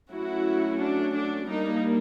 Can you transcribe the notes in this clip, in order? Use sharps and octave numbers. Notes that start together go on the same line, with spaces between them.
F#3 A3 C#4 E4 F#4
D4
D4
G3 A#3 D4 D#4